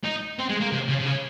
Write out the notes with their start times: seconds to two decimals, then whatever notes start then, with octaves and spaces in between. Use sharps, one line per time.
0.04 D#4
0.39 C4
0.50 G#3
0.61 A#3
0.73 C3
0.89 C#3
1.00 C3
1.06 C#3